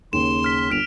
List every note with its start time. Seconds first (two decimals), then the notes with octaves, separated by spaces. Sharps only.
0.13 D#2 C#3 C6 E7
0.44 F6 B6
0.71 G1 F6 D7 F7